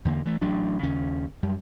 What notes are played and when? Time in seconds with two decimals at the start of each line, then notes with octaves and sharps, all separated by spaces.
0.05 E2 D3 A#3
0.25 E3 A3
0.41 A1 F#3 D4
0.83 D#2 C#3 C#4
1.43 F#2 G3